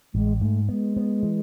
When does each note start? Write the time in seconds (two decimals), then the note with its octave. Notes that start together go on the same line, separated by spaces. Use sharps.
0.14 A1 G#3
0.41 G#2 A3
0.69 G#3 B3
0.97 B3
1.23 E3